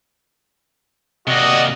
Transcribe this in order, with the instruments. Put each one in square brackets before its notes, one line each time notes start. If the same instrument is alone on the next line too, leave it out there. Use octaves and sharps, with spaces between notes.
[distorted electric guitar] C3 A#3 [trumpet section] F#4 D5 D#5